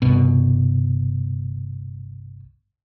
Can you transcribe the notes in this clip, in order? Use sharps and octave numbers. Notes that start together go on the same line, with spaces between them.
G1 C2 B2